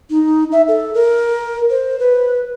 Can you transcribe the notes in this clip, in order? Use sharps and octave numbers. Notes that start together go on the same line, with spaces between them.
D#4
E5
A4
A#4
C5
B4